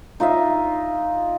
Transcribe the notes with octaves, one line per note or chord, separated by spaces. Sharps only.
D#4 F4 D#5 E5